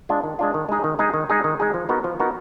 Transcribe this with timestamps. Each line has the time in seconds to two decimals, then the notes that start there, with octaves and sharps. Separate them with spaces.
0.09 G#3 D4 F4
0.24 D#3
0.39 G#3 D4 F4
0.54 D#3
0.69 G#3 D#4 G#4
0.84 D#3
0.99 G#3 D#4 G#4
1.14 D#3
1.30 G#3 D#4 G#4
1.44 D#3
1.60 G#3 D#4 G#4
1.74 F3
1.89 B3 D#4 F#4 A#4
2.04 F3
2.20 B3 D#4 F#4 A#4